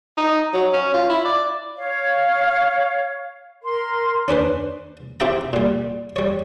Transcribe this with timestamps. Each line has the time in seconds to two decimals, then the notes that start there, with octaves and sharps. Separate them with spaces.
0.17 D#4
0.54 F#3
0.73 C#4
0.94 F4
1.10 E4
1.25 D5
1.76 C#5 F5
3.63 A#4 C6
4.28 C#4 D4 B4 C5
5.20 C4 E4 G4 E5 G5 A#5
5.53 A#2 G3
6.16 G3 C#5